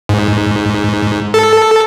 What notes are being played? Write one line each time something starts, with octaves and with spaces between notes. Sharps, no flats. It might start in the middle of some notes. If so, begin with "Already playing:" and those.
G#2
A4